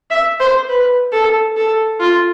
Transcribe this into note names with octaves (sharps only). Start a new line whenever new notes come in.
E5
C5
B4
A4
A4
F4